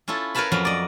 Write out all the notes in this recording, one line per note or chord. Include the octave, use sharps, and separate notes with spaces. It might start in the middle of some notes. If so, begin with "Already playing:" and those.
C#4 E4 F4 A4
A#4 B4 C#5 F5 A5 B5
F2 F#3 C#4 F5 A#5 B5
D5 D#5